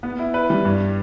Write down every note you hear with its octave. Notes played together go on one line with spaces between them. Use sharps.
B3
E4
B4
G3
G2